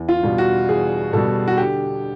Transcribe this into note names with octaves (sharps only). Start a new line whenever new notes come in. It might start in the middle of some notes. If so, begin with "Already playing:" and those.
Already playing: E2
F4
B2 G3
F#4
E2 G#4
B2 G3 A4
F#4
D3 G4